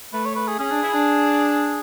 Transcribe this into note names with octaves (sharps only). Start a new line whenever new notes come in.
A3 B4
C#5
B4
G#4
C#4 G#4
D4
E4
D4